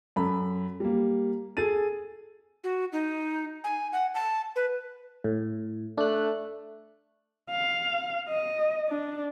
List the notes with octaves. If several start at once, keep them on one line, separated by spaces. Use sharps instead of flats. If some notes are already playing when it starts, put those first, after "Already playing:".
F#2 A4 B5
G3 A#3
G#4 A4 A6 D#7
F#4
D#4
G#5
F#5
A5
B4
A2
A3 D4 F#6
F5
D#5
D4